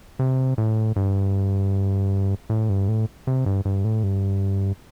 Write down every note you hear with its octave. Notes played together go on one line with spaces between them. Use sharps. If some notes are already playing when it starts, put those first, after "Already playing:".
C3
A2
G2
A2
G2
A2
C3
G2
G2
A2
G2